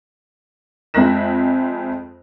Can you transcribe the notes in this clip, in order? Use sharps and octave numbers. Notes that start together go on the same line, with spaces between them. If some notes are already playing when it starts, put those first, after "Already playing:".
F2 G#3 E5 F#6 A#6 E7